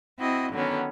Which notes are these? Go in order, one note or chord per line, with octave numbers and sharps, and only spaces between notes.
C4 E4 F#4 D#5
D3 D#3 F#3 B3 C#4